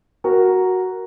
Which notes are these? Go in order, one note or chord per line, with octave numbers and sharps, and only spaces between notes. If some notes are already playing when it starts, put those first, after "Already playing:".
F#4 A#4